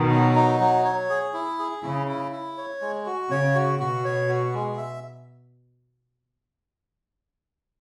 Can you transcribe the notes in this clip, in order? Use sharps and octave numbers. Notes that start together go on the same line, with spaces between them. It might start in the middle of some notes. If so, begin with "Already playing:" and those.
Already playing: B2 D#3
F#3
D#4
F#3
C#5
G#4
E4
G#4
C#3 E4
E4
E4
C#5
G#3
F#4
C#3 C#5
F#4
B2 F#4
C#5
F#4
G#3
E5